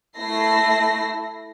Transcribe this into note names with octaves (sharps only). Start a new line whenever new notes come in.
A3 E4 A4 A#6 C7